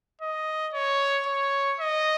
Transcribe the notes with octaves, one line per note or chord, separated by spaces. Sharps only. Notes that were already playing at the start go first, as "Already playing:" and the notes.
D#5
C#5
C#5
D#5